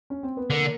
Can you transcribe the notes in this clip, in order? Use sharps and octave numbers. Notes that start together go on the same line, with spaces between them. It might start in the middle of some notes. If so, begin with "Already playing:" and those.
C#4
C4
B3
D3 A#3